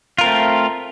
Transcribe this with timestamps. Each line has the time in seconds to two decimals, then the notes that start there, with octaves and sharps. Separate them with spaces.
0.18 F4
0.21 A#4
0.24 C4
0.26 A3